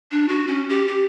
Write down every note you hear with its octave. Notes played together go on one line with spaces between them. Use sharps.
D4
F#4
C#4
G4
G4